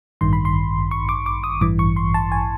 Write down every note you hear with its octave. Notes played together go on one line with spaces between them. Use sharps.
A1 G2 D#3 C6
B5
C6
C#6
D6
D6
D#6
A1 G2 E3 D6
C#6
C6
A5
G#5